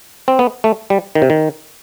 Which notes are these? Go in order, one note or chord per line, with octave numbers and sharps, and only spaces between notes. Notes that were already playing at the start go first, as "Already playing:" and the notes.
C4
B3
A3
G3
D#3
C3
D#3